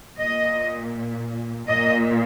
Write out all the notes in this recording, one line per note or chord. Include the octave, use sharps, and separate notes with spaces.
A#2 D#5
A#2 D#5